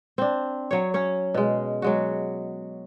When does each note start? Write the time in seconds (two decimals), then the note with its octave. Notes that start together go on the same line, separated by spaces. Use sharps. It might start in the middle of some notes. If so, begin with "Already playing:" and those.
0.18 C4 D4
0.71 F#3 C#5
0.94 C#4 C#5
1.34 B2 G#3
1.82 F#3 G#3 F#4